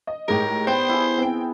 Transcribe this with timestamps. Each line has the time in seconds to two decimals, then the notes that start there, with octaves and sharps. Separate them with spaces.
0.07 D#5
0.28 A2 G#3 D#4 G4 A#4
0.67 B3 C5 G5
0.89 E4 G#4
1.18 C4 G5